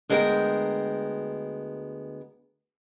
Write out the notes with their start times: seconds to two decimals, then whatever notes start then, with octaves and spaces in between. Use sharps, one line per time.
0.10 D2 G#3 B3 A#4 E5 G5